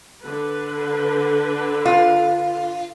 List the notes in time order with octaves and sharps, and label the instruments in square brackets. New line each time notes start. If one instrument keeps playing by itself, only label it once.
[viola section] D3 B4
[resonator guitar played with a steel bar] F4